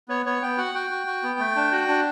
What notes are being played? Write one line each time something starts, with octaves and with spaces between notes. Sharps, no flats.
B3 C#5
B3 C#5
B3 G5
F#4 F#5
F#4 G5
F#4
F#4
B3
A3
D4
F#4
D4